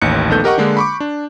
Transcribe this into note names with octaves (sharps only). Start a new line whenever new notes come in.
A1 D#2 F#6 C#7
A#1 D#3 A3 B3 A4 G6
G4 A#4 D#5 F#5 C#6
D3 G#3 A#3 D4
B5 C#6 D6
D4